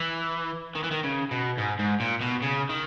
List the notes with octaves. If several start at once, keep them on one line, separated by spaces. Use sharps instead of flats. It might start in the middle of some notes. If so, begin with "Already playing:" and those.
Already playing: E3
D#3
E3
D#3
C#3
B2
G#2
G#2
A#2
B2
C#3
D#3